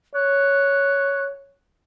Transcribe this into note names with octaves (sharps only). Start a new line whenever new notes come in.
C#5 F#6